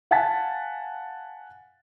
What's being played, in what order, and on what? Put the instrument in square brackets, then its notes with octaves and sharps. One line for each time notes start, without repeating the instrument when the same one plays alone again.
[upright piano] F5 F#5 G#5 A5 A6 B6